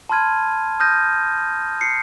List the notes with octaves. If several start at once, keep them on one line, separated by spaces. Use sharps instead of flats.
A5 B5 C6 F6 G#6 D#7
D#6 F6 G6 A#6 D#7
C7 C#7